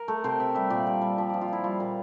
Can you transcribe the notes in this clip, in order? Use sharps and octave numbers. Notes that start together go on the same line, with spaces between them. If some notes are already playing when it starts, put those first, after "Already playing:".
Already playing: A#4
A3
C3 C5
C3 E5
G3 E5
A#2 D5
G3
G3
F3 E5
F3 D5
F4
F3 E4
G3 F4
A#2